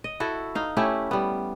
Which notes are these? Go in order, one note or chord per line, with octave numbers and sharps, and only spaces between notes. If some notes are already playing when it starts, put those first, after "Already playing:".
D#5
E4 F#4 A4
D#4 F5
A3 C#4 E4 G4
G3 B3